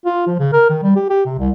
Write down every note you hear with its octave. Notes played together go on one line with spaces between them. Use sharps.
F4
F3
C#3
A#4
D#3
G3
G4
G4
C3
C2